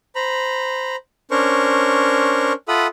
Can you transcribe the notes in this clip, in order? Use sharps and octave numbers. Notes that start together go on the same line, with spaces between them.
C5 A#5 B5
C#4 D4 A#4 C5 C#6
F4 A4 E5 F#5 B5 D#6